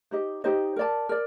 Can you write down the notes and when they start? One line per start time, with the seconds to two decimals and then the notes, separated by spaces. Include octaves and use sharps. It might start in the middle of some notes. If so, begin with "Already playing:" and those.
0.11 D#4 G4 C5 D#5
0.44 D#4 G4 C5 D#5
0.76 A#4 D5 A5
1.09 A#4 D5